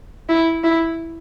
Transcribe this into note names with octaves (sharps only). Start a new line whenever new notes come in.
E4
E4